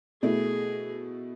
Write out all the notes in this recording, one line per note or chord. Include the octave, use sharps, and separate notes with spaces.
B2 A3 E4 G#4